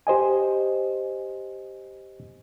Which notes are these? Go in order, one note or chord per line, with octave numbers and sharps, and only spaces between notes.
G4 C5 D#5 G#5